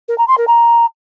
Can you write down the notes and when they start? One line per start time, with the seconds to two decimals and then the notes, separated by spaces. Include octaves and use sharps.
0.08 A#4
0.18 A#5
0.28 C6
0.38 A#4
0.47 A#5